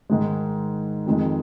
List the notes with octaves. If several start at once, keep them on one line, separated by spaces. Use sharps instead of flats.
G#2 D#3 G#3
F2 D#3 G#3